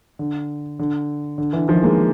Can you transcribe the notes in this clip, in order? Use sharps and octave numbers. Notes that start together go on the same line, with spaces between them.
D3
D3
D3
D3 E3
D#3 F3
G#3 A#3